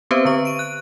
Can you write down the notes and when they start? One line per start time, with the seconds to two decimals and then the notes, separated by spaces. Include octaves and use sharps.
0.11 B3 C4 G4 B4 C5
0.25 D3 B4 C#6
0.45 D7 D#7
0.59 F#6